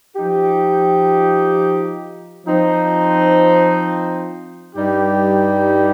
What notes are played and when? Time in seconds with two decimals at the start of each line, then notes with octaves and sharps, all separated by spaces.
0.16 F3 D#4 G4
2.46 F3 C4 D#4
4.75 G2 G3 D#4 G4